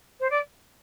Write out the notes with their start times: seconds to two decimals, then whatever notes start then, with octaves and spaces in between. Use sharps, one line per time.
0.20 C5
0.30 D5